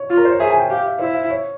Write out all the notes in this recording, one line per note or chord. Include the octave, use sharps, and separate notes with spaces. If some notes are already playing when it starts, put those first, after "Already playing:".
Already playing: C#5
F4
A#4
C5
C#5
G#4 E5
G#5
G5
G4 F5
E5
E4 C5
E5
C#5